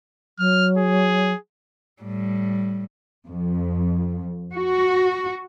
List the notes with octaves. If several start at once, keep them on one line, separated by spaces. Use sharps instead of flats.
F#3 F6
G#4
A2 G3
F2
F#4